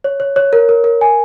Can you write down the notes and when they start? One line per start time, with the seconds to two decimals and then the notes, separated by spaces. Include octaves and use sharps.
0.04 C#5
0.20 C#5
0.36 C#5
0.53 A#4
0.69 A#4
0.84 A#4
1.01 G#5